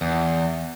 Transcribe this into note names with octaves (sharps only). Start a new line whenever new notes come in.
E2